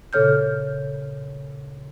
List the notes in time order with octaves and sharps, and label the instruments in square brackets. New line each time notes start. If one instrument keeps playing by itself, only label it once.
[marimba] A#2 C#3 A4 C#5 F6 G6